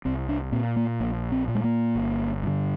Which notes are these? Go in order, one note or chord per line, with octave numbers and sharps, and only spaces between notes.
C2 C4
D4
A#2 C4
A#3
A#1 A#3
C4
A#2
G#3
A#3
G1
G2 D3